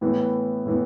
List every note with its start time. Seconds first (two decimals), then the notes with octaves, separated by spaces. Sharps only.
0.01 A2 E3 B3
0.66 A2 E3 B3